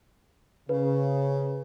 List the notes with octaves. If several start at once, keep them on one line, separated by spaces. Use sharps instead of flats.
C#3 B4